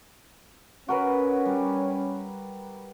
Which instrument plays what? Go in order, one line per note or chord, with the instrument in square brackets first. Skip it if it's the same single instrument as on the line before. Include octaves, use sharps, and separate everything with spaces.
[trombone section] C#4 [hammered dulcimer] F#4 A#4 B4
[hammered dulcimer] G3